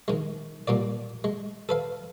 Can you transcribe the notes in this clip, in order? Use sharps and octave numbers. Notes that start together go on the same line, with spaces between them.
D#3 G#3
A#2 G3 A#3 D5
G#3
A4 B4 F5